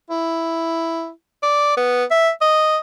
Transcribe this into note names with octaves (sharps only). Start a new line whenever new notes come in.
E4
D5
B3
E5
D#5